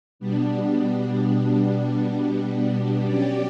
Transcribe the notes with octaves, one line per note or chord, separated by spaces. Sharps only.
B2 G3 B3 D4
F#3 C#4 G4 D5